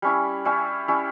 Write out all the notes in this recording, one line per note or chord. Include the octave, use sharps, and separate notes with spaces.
G3 C#4 E4
G3 C#4 E4
G3 C#4 E4